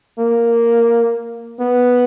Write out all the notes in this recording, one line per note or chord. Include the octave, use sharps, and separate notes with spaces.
A#3
B3